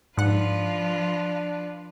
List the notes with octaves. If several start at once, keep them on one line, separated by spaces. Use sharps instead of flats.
G#2 F3 D4 F4 B4 F#5